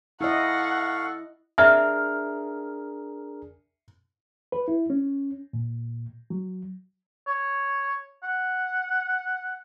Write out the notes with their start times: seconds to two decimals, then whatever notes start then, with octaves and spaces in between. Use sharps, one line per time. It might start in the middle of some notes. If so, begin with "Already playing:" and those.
0.21 E4 A4 D#5 F5 F#5 C#6
1.58 D4 G#4 A#4 E5 F6
4.52 B4
4.68 E4
4.90 C#4
5.53 A#2
6.30 F#3
7.27 C#5
8.23 F#5